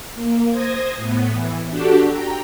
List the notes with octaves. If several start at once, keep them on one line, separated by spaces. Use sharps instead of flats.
A#3
C5 D#6 G#6 A#6
A2 B3
E3
D4 F#4 G4 A4
G5 A#5